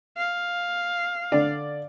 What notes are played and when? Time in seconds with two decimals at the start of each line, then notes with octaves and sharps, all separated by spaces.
0.17 F5
1.32 D3 D5